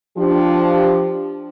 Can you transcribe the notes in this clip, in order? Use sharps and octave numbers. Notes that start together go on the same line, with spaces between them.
F3 D4 G4